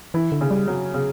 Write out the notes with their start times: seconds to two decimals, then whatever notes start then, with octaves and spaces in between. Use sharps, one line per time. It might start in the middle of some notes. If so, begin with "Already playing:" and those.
0.14 E3 E4
0.32 D3
0.41 C#3
0.51 G3
0.68 F#3
0.94 C#3